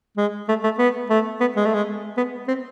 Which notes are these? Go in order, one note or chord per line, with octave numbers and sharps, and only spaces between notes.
G#3
A3
A3
B3
A3
B3
G#3
A3
G#3
B3
C4